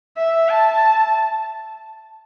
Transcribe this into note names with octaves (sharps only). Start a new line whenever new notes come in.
E5
A5